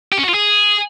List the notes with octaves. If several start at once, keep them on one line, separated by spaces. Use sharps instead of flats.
G4
C#4
F#4
F4
G#4